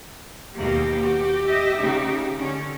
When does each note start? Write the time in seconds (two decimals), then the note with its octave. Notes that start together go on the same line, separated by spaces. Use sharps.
0.56 D#2 B2 A#3 G4
1.04 F#4
1.47 D#5 E5
1.79 C#3 D#4
2.35 D3 C#4